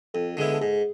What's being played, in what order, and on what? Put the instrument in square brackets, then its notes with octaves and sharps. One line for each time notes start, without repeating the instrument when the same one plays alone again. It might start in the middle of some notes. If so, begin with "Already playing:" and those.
[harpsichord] F2 [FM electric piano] A4
[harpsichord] D3 G#3 B3 E4
[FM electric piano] A4
[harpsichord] G#2 [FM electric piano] G#4